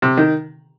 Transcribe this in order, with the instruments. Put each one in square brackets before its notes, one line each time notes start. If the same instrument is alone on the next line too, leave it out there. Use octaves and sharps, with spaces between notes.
[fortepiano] C3
D#3